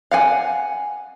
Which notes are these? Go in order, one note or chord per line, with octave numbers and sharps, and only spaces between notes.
F5 F#5 G#5